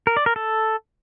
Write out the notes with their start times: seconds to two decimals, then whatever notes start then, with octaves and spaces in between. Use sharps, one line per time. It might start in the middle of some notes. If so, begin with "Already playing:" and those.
0.07 A#4
0.17 D5
0.26 A#4
0.36 A4